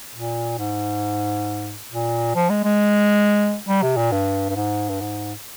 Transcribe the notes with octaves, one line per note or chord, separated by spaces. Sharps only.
A#2
G#2
A#2
F3
G#3
G#3
G3
C3
A#2
G2
G2
G#2
G2
G#2